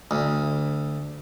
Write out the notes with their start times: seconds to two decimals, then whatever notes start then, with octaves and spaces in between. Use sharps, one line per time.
0.11 D2